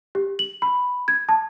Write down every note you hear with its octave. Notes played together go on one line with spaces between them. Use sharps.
G4
F#7
B5
G#6
A5